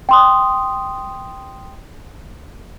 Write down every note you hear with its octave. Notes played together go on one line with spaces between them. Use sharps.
G5 C6 D#6